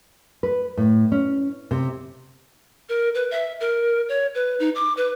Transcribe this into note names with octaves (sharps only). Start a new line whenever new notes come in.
B4
A2
C#4
C3
A#4
B4
E5
A#4
C#5
B4
D#4
D6
B4